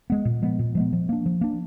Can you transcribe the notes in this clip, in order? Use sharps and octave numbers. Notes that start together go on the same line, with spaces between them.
G#3 B3
A#2
F3 G#3 B3
A#2
F3 G#3 B3
F3
A#3 D4
F3
A#3 D4